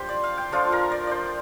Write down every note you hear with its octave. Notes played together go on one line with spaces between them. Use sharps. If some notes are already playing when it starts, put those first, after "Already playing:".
Already playing: G3 D4 F4 G4 C5
D5
F5
G5
F3 A3 D4 F4 F5
A#4
D5
C5 D5